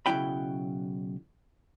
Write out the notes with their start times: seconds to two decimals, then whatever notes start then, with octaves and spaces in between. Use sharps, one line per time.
0.06 B1 C#3 F#3 E4 G5 B5